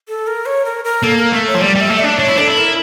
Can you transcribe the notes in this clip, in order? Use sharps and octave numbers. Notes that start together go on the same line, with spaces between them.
A4
A#4
C#5
A#4
A#4
A#3 A4
A#4
A3 A#4
C#5
F3
G3 D5
G3 E5
A3
D4 D5
D4 C#5
E4
D4 A4
E4
A#4